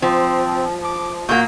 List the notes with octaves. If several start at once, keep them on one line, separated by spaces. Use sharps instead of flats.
F3 C4
D6
A#2 A#3 F#4 G6